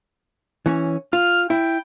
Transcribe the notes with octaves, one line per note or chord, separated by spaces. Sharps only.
E3 C#4
F4 F6
E4 G5